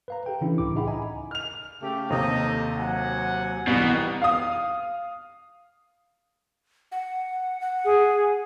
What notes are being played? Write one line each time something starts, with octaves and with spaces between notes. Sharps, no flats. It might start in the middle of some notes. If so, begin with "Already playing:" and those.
B4 F5 A#5
G4 A4 G5
C#3 E3 C#4 D4 E4 G4
C#2 A2 E4 D6
D#4 G#4 E5 F#5 G5 B5
D#5 G#5 A#5 B5
F6 F7
C#3 A3 G4
D#2 C3 D#4 A4 D#5
F#3 F#5 G#5
C2 B2 E3 G3 D#4
F5 D#6
F#5
F#5
G#4